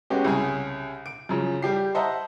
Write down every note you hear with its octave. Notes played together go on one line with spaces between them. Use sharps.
G#3 B3 C#4 F#4 G4
C2 C#3 G#4
D7
F#2 C#3 F3
G3 G4 C7
C5 D#5 E5 F#5 A5 A#5